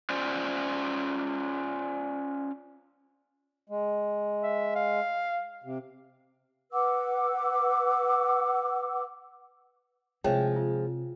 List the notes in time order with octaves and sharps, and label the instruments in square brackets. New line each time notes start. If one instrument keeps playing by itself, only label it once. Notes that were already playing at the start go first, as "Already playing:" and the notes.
[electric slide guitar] C#4 F4 C5 D5
[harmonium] G#3
[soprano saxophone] E5
F5
[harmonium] C3
[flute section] B4 F#5 D6 E6
[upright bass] C3 [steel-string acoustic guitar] F3 G#3 [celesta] C#5 E5 G5
[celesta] F4